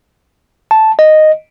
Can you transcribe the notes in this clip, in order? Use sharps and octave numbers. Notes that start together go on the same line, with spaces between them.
A5
D#5